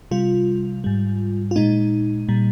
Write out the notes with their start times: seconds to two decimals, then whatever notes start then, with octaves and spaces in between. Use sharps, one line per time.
0.11 C3 G3 F4
0.84 G#2 G3
1.51 F4
1.56 A#2 G#3 D#4
2.29 A#2 G3